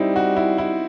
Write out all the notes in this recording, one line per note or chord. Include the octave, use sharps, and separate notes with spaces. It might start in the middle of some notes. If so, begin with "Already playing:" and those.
Already playing: G3 C4 D#4 E4
F#4
E4
E4